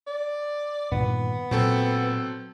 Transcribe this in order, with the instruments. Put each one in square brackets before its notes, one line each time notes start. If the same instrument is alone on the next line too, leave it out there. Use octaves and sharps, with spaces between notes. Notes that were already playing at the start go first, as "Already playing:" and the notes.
[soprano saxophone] D5
[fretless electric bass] G2 A#2 D#3 [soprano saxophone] B3
[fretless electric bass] A#2 [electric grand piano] F#3 C4 A4